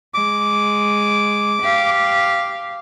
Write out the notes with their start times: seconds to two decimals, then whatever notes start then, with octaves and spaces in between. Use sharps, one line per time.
0.14 G#3 D6
1.62 G4 F5